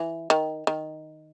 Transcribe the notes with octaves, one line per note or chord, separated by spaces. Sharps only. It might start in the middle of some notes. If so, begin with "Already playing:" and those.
Already playing: E3
D#3
D#3